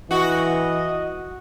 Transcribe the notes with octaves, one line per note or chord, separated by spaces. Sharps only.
E3 F#4 D#5